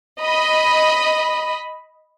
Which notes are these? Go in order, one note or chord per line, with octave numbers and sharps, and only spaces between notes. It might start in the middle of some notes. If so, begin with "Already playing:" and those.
D#5 B5